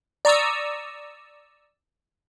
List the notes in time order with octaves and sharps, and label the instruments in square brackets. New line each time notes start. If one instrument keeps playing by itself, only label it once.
[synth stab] D5 A#5 C#6 D#6 E6